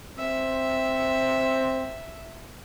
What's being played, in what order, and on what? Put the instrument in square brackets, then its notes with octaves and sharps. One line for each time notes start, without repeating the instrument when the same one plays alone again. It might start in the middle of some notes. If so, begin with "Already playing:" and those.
[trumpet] C4 [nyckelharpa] E5